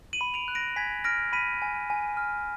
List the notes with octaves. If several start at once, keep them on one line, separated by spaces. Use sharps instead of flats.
D#7 F#7
B5
D7 F7
F#6
A#6 D7
G#5 G#6 B6
F6 A#6 D7
B5 B6 D#7
G#5
G#5
F6